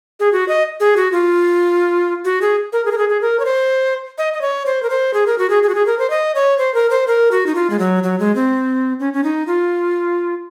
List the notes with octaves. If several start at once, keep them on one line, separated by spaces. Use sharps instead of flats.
G#4
F#4
D#5
G#4
F#4
F4
F#4
G#4
A#4
G#4
A#4
G#4
G#4
A#4
C#5
C5
D#5
D#5
C#5
C5
A#4
C5
G#4
A#4
F#4
G#4
G#4
F#4
G#4
A#4
C5
D#5
C#5
C5
A#4
C5
A#4
F#4
D#4
F4
G#3
F#3
F#3
G#3
C4
C#4
C#4
D#4
F4